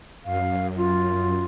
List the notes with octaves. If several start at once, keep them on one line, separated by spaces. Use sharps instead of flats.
F#2 F5
F4